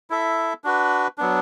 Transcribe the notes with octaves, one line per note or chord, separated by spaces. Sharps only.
E4 A4 E5
D4 F#4 B4
F#3 B3 D4